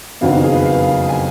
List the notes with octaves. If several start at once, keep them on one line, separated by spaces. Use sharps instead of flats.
F#1 F2 D#3 F#3 B3 F5
F5
G#4
B4
F5
G#5